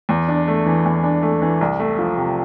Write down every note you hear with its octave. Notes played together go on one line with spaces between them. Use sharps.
E2
D4
A3
E3
E2
D4
A3
E3
C2
A3
F3
C3